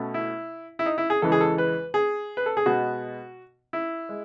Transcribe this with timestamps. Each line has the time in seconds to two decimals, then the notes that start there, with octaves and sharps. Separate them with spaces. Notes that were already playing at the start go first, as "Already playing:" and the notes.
Already playing: B2 A3 C#4
0.14 E4
0.79 E4
0.86 D#4
0.98 E4
1.10 G#4
1.22 E2 C#3 E3 G#3 A4
1.32 G#4
1.41 A4
1.58 B4
1.94 G#4
2.37 B4
2.46 A4
2.57 G#4
2.66 B2 G#3 B3 F#4
3.73 E4
4.09 G#3